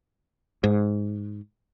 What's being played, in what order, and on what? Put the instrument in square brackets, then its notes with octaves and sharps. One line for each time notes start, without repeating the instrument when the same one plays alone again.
[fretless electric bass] G#2